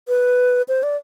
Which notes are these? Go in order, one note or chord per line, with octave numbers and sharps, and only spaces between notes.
B4
C5
D5